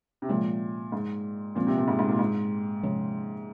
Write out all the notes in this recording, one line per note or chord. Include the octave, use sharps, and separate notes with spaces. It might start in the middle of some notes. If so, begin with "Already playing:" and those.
C3
A#2 F3 G#3 C#4
G#2
A#2 F3 G#3 C4
C3
A#2
G#2
G#2
A#2
G#2
C3 F3 G#3 C#4